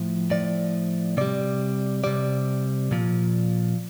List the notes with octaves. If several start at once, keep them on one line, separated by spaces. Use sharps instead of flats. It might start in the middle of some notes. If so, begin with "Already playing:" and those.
Already playing: A2 F3
A2 F3 D5
C3 G3 D5
C3 G3 D5
A#2 F3